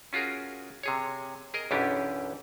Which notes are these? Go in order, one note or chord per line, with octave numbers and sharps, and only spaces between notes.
C#4 F4 F#4 G#4 A#4
C3 G#4 C#5
G#4 A#4 D#5
B1 F#2 E3 C#4 D4 G4